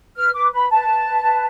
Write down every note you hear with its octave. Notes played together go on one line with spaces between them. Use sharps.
B4 F6
B4 D6
B4 B5
B4 A5
B4
B4
B4